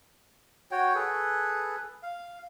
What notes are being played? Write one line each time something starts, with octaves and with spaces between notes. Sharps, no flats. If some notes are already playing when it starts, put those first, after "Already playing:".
F#4 C#5 G5
G#4 A4 B4
F5